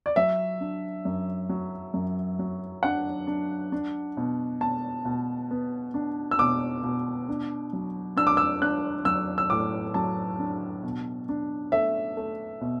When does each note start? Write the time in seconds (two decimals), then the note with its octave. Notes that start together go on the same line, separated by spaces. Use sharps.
0.06 D5
0.16 F#3 E5
0.60 D4
1.05 F#2
1.49 F#3
1.94 F#2
2.39 F#3
2.83 D4 F#5
3.27 D4
3.72 D4
4.17 B2
4.61 B2 A5
5.05 B2
5.51 B3
5.94 D4
6.31 E6
6.39 B2 D6
6.84 B2
7.28 D4
7.73 F#3
8.17 D4 E6
8.27 D6
8.37 E6
8.62 D4 F#6
9.05 F#3 E6
9.38 E6
9.50 A2 D6
9.94 F#3 A5
10.39 D4
10.83 B2
11.29 D4
11.72 A3 E5
12.17 A3
12.61 B2